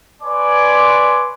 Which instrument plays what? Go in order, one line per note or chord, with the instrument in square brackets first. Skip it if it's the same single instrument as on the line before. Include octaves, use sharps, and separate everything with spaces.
[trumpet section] B4 C#5 D5 G#5 C6 D6